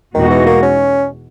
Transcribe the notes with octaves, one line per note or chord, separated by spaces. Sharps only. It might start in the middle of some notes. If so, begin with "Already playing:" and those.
E2 B2 D#3 G#3 D#4 F#4
E3
A#3
C#4